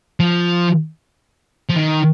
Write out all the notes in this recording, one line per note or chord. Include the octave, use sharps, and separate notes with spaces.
F3
F3
D#3